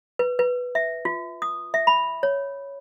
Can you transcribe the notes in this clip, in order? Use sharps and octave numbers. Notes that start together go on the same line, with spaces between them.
B4
B4
E5
F4
D#6
E5
B5
C#5